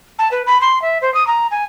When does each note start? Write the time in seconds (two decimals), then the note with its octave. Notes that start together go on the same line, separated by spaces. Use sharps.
0.19 A5
0.31 B4
0.46 B5
0.61 C6
0.82 E5
1.02 C5
1.14 D#6
1.27 A#5
1.51 G#5